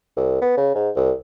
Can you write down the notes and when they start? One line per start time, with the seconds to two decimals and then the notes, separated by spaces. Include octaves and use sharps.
0.17 C2
0.42 B3
0.57 C#3
0.75 G#2
0.96 C2